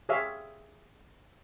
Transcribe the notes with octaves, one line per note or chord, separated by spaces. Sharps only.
G4 G#4 C#5 E5 F5